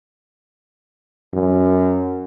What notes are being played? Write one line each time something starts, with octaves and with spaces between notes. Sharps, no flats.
F#2